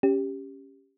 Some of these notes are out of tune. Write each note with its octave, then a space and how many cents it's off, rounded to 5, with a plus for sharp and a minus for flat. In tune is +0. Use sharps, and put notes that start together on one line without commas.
C#4 +0 G4 +5